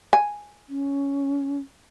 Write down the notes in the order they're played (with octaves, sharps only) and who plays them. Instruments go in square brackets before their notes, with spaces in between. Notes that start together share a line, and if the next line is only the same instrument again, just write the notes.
[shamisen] G#5
[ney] C#4